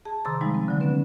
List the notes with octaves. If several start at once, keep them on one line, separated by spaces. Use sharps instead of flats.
G#4 A5
C3 D#3 A#5 C6 D6 A6
F3 G3 G#3 D#4 B5
C4
D3 F#3
B3 C#4 B4